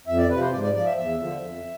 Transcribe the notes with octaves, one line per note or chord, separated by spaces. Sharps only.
F2 E5
D5
C3 F3 B4
C5
G#2 D5
D5
F3 D5
E5
E2 E5
D3 F3
F2